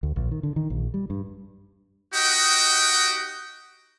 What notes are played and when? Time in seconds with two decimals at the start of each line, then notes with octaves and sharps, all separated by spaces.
0.03 D2
0.16 A#1
0.31 D#3
0.43 D3
0.56 D#3
0.70 A#1
0.94 G3
1.10 G2
2.14 D#4 F#4 G4 D#5 F#5 G5